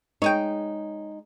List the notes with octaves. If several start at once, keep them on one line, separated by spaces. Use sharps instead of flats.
G#3 D#4 C#5 D#5 G5